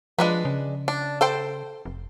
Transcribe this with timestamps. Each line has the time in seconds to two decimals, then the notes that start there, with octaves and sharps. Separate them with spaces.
0.19 F3 G#3 D4 B4
0.45 C#3
0.88 D4
1.21 A4 C5 G5
1.86 F1